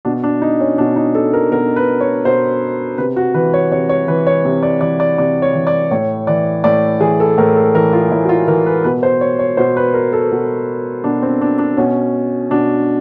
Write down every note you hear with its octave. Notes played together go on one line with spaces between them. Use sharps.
B2 D4
D4
D#4
C#4
B2 D4
D#4
A4
A#4
B2 A#4
B4
C#5
B2 C5
C3 B4
F#4
E3 B4
C#5
C3 C#5
C#5
E3 B4
C#5
C3
D5
E3 D5
D5
C3 D5
C#5
E3
D5
A2 C#5
E3 D5
A2 D5
E3 G#4
A4
A2 A#4
A4
E3 A#4
F4
A2 E4
F#4
F4
E3 A#4
B4
B2 B4
C5
C#5
C#5
B2 C5
B4
A#4
A4
B2
B2 D4
C4
D4
D4
B2 C#4
B2 D4